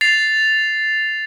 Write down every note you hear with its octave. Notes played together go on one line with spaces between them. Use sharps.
A6 C7 F7